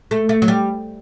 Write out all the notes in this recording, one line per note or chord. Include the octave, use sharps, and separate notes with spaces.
A3
A3
F#3
G3